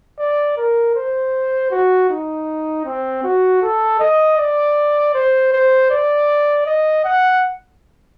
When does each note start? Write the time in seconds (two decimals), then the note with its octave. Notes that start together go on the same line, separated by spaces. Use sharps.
0.19 D5
0.57 A#4
0.96 C5
1.71 F#4
2.10 D#4
2.86 C4
3.24 F#4
3.62 A4
4.00 D#5
4.38 D5
5.14 C5
5.53 C5
5.91 D5
6.66 D#5
7.05 F#5